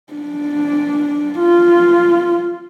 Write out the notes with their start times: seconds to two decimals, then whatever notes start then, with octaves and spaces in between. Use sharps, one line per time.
0.13 D4
1.39 F4